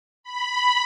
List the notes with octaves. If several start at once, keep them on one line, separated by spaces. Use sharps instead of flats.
B5